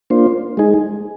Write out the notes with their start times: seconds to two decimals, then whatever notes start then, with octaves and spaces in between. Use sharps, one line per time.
0.10 A#3 D4 F4 C5
0.57 G#3 D#4 G#4